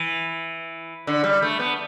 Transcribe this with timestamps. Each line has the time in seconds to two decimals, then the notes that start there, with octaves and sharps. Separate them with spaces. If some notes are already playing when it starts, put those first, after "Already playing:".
Already playing: E3
1.07 D3
1.24 G3
1.42 A3
1.59 B3